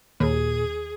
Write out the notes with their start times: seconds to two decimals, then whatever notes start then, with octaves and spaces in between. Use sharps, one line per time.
0.20 D#2 A#2 G#4